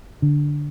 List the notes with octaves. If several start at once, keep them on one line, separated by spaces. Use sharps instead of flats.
D3